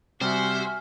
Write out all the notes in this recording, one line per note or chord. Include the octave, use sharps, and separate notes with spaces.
C3 G3 F#4 C5 E5 G#5 F6